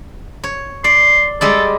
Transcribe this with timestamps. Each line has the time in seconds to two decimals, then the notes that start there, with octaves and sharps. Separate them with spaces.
0.44 C#5
0.84 D5 C6
1.41 G3 G#3 A4 D5